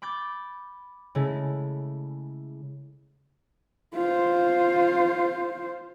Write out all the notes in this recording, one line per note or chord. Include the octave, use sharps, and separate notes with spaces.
B5 D6 G6 A6
C#3 G#3 A3 E4
F4 C5